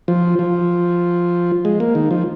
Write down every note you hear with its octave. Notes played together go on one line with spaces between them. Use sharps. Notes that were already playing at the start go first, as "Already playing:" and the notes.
F3
F3
G#3
A#3
D#3
F3